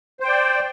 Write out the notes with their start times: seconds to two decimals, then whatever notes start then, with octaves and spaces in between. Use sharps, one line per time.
0.20 C5
0.24 G5
0.28 D5